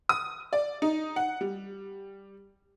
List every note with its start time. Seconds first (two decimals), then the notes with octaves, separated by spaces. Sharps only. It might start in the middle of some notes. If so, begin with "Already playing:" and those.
0.09 D#6
0.53 D5
0.82 D#4
1.16 F#5
1.41 G3